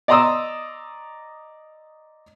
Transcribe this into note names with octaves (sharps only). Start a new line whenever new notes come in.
D5 D#5 A#5 C6 D#6 E6